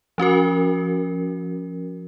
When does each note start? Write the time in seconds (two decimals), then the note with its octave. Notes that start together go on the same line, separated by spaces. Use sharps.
0.18 F3 C#4 F#4 A#4